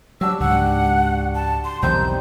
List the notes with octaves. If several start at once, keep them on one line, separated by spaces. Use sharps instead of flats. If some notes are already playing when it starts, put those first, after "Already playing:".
F#3 D4 F#4 G4 E6
C#2 G#2 F#5
A5
C6
B1 E2 D#3 G3 C4 D#4 G6